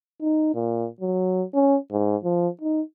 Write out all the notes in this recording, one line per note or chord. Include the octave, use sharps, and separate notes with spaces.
D#4
A#2
F#3
C#4
G#2
F3
D#4